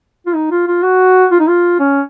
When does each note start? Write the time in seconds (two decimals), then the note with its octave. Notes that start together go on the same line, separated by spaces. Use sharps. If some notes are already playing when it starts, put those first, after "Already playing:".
0.26 F4
0.35 D#4
0.51 F4
0.68 F4
0.83 F#4
1.31 F4
1.40 D#4
1.48 F4
1.79 C#4